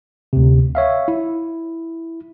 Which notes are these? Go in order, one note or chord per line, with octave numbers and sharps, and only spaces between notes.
D2 C3
C#5 E5 F5
E4